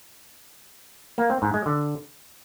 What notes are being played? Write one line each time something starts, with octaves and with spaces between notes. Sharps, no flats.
A#3
C4
G#2
G#3
D3